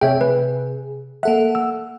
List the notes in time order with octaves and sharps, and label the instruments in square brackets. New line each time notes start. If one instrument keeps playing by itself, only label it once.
[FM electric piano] C3 G#4 [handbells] C#5 E5 G5
[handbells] B4
[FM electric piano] A#3 A4 F#5 [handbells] E5
[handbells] E6